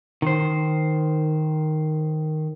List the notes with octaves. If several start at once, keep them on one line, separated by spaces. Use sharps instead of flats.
D#3 C5